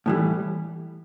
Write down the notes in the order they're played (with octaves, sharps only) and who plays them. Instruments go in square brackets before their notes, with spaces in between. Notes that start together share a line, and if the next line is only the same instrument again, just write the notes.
[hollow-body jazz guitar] A2 E3 G3